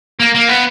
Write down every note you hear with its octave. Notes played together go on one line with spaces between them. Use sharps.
A#3
A#3
B3